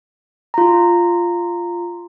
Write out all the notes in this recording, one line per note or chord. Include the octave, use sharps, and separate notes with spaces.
F4 A#5